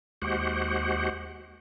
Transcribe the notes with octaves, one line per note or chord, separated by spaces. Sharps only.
D#2 G#3 F#4 G4 C5 F#5